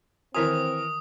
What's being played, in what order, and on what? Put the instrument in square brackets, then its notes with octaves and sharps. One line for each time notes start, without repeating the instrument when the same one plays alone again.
[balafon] D#3 F#4 [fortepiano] E3 A#4 G#5 [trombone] C4 [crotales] D#6